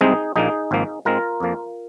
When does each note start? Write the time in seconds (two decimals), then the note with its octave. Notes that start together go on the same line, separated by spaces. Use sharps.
0.01 C2 C3 G#3 C4 D#4 G#4
0.36 A#1 A#2 A#3 D#4 G#4
0.71 G#1 G#2 F3 A#3
1.05 G#2 G#3 C4 F4 A#4
1.40 F2 F3 A#3